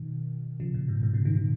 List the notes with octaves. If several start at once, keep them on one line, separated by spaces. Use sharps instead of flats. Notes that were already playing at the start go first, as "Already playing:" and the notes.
Already playing: B2 D#3
C#3 F3
A#2 C#3
G#2 B2
G#2 B2
A#2 C#3
B2 D#3
B2 D#3